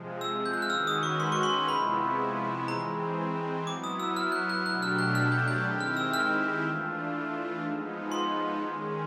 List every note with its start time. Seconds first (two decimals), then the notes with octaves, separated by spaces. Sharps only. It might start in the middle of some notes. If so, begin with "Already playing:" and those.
Already playing: C3 F3 G#3
0.21 E6
0.46 G6
0.54 F#6
0.62 F6
0.70 D#3 G#3 C#4 F#4 B4 E6
0.87 D#6
1.03 C#6
1.20 C6
1.32 C#6
1.43 C6
1.68 C3 F3 G#3 B3 E4 B5
2.68 E3 G#3 C4 A#5
3.66 F#3 B3 E4 D6
3.84 D#6
4.00 E6
4.16 F6
4.32 F#6
4.49 F#6
4.65 B2 F#3 A3 D4 G4 F#6
4.82 F6
4.98 F#6
5.15 F6
5.32 G6
5.48 G6
5.65 D#3 G#3 C4 E4 G4
5.81 F6
5.97 E6
6.13 F6
6.62 E3 A3 D4 F4
7.62 F3 G#3 B3 D#4
8.12 C6
8.60 D#3 G#3 C#4